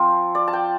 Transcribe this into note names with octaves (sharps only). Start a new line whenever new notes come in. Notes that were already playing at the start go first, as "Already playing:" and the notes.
Already playing: F3 C4 F4
D5
A5
G5